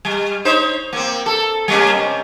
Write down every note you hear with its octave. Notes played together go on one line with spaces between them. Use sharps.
G3
D#4 C5 C#5
A#3 C4
A4
G3 A#3 C#4
C3 C#4